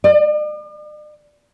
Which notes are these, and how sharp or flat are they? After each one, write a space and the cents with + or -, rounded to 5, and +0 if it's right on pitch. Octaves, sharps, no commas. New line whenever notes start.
D5 +45